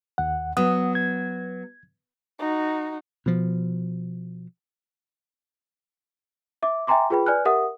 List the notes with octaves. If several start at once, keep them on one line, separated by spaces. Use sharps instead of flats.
D#2 F#5
F#3 B3 F#5 D#6
G#6
D#4 F#4
B2 F3
E5 D6
E5 G5 G#5 A#5 C6 D6
F4 G#4 B4 G5 B5
B4 D5 G#5 F6 F#6
G4 A#4 E5 F#5 D#6